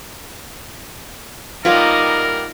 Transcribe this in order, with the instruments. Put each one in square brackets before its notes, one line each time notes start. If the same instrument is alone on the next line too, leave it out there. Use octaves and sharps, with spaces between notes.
[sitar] G3 A#3 B3 [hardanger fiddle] D#4 [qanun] F4 C#5 F5 [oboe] A#4